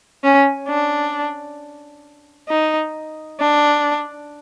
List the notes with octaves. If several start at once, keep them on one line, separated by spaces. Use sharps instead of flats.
C#4
D4
D#4
D4